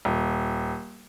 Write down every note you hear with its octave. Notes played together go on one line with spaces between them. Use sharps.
D#1